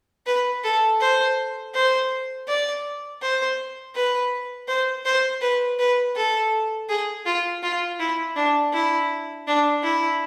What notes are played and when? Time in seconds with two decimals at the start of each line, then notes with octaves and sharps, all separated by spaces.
0.27 B4
0.64 A4
1.01 C5
1.75 C5
2.48 D5
3.22 C5
3.95 B4
4.68 C5
5.05 C5
5.42 B4
5.79 B4
6.16 A4
6.89 G#4
7.26 F4
7.63 F4
7.99 E4
8.36 D4
8.73 E4
9.47 D4
9.84 E4